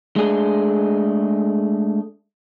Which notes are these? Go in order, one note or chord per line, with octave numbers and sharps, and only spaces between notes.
G#3 A3 D4 G#4